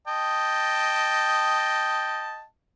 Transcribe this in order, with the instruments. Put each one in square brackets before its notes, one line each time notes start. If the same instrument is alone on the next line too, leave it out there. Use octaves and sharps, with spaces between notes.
[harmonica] D#5 G5 A5